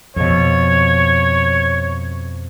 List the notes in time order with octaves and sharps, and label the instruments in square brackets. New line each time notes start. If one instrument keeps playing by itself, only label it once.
[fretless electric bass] F2 B2 [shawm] C#5